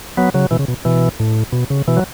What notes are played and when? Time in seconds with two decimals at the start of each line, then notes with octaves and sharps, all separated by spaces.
0.17 F#3 B3
0.34 C#3 F#3
0.51 B2 E3
0.59 C#3
0.68 B2
0.85 B2 E3
1.20 A2
1.52 B2
1.70 C#3
1.88 B2 E3
1.97 F#3